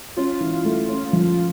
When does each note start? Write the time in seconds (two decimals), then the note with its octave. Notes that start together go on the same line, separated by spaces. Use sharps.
0.17 C#4 F4
0.40 E3
0.65 A3
0.89 C#4
1.13 F3